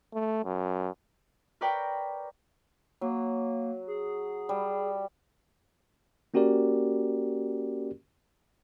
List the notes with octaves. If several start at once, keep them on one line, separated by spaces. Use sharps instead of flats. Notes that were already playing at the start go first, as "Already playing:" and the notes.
A3
F#2
A#4 B4 C#5 D5 G5
F#3 A#3
G#4
G3
A#3 C#4 F#4 G4 A#4 D5